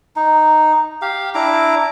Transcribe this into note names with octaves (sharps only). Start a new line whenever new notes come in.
D#4
G4 F5
D4 E4 A#5 D6